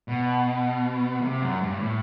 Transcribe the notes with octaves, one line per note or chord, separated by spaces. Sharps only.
B2
C3
F#2
G2
A2